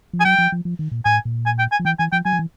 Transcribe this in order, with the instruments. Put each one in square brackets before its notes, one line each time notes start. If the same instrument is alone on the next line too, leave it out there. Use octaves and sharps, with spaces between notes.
[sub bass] F3
[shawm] G#5
[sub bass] F#3 [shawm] G5
[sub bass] F3
F3
F3
D#3
A#2
[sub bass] A2 [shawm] G#5
[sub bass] A#2
[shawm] G#5
G5
G#5
[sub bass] F3
[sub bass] E3 [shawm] G5
[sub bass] E3 [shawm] G#5
[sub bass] F3 [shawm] G5
[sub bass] F#3 [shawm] G#5
[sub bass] F3
E3